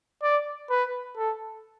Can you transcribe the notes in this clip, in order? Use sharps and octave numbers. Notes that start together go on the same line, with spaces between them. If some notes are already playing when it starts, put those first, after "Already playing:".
D5
B4
A4